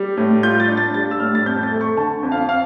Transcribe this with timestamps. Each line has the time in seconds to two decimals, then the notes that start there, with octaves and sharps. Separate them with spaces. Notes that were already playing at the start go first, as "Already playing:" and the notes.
Already playing: G3
0.17 A2
0.43 F4 G6
0.60 A6
0.69 D4
0.77 A6
0.94 G3 A6
1.11 E6
1.20 A2 F6
1.35 A6
1.46 F2 G6
1.63 A6
1.72 A3
1.81 C#6
1.97 D3 A5
2.23 F2
2.32 F5
2.49 F5